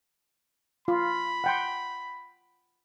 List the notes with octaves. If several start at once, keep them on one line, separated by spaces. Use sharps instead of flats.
F4 B5
F#5 G5 C6